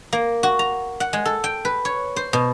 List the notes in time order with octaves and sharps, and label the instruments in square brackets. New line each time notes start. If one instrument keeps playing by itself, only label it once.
[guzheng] A#3
F#4
A#5
F#5
G#3
A4
G5
B4
C#5
C5
B2